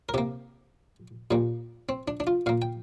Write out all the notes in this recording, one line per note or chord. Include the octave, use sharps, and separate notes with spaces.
A#4
C3 A#3 G4
A#2 G3 A#3
C4
D4
D4
F4
A#2 A#3 F5
G5